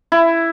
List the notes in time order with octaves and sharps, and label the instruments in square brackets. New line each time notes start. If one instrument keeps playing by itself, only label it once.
[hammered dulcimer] E4